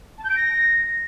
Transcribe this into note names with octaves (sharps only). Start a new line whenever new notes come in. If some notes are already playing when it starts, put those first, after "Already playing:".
A5
G6
D7
A#6